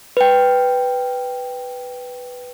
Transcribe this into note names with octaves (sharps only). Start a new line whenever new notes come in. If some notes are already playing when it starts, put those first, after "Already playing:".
B4 G5